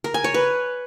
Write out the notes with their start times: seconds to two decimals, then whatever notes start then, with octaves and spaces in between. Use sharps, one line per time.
0.04 A#4
0.14 G#5
0.24 C#5
0.34 B4